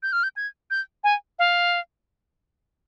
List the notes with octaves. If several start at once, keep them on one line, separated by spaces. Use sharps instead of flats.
G6
F6
G6
G#6
G6
G#5
F5